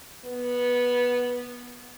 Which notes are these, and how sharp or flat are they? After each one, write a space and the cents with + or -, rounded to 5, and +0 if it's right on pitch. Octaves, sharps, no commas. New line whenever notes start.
B3 -10